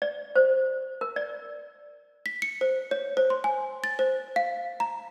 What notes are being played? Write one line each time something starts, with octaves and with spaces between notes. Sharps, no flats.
D5
C5
A#4
D5
B6
C#7
C5
C#5
C5
C6
G#5
A6
C5
F5
A#5